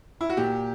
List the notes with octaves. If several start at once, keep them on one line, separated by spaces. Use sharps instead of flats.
E4
F#4
A#2 G4